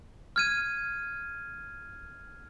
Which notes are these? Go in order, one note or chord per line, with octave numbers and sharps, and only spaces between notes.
F6 G#6 D#7